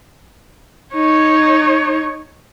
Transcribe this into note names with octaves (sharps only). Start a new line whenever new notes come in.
D#4 C#5